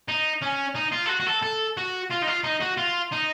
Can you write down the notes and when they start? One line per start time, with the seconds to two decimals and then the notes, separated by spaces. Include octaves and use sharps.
0.08 D#4
0.42 C#4
0.75 D#4
0.92 F4
1.06 A4
1.09 F#4
1.20 F#4
1.27 A4
1.43 A4
1.77 F#4
2.10 F4
2.22 D#4
2.27 F4
2.44 D#4
2.61 F#4
2.77 F4
3.12 D#4